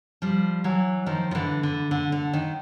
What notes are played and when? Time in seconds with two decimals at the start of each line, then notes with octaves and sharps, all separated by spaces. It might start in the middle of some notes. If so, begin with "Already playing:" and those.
0.22 F3 G3
0.64 E3 F#3
1.06 D#3 F3
1.31 F3
1.35 D3 E3
1.63 D3
1.91 D3
2.12 D3
2.33 D#3